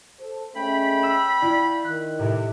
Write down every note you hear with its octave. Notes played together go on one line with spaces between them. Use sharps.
A4 C5
G#3 A3 C#4 G5 B5
E6
E4 F4 D5
D#3 F#6
A2 C3